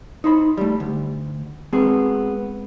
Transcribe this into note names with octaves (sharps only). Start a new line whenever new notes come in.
D#4 C5 B5
G3 A3
D2
G#3 B3 C4 F#4 G#4